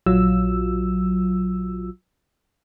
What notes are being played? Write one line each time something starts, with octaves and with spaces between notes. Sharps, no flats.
A#1 F#3 F4 E6